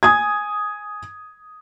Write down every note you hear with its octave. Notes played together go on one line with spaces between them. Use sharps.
G#5 D#6 G#6